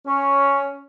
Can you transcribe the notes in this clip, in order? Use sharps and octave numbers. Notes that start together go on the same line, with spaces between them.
C#4